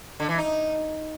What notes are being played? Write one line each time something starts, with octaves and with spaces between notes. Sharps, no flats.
D3
E3
D#4